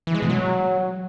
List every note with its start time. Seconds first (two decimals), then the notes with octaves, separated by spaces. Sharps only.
0.07 E3
0.15 G#3
0.22 B2
0.30 F#3